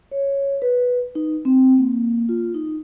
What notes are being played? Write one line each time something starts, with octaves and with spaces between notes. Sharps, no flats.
C#5
B4
D#4
C4
A#3
F4
D#4